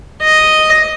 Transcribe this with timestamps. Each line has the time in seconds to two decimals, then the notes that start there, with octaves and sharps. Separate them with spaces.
0.23 D#5